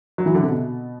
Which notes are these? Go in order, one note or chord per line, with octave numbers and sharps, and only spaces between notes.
F#3
E3
D3
C3
B2